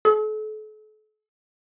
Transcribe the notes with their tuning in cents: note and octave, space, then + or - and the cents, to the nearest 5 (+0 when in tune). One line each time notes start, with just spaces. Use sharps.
A4 -40